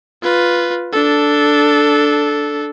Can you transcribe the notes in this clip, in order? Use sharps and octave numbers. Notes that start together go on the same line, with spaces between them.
F4 B4
D4 A4